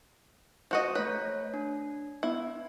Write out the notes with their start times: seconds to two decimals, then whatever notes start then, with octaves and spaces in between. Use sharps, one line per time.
0.71 F3 F#4 D#5
0.95 A3 B4 C#5
1.54 D4
2.23 B3 E4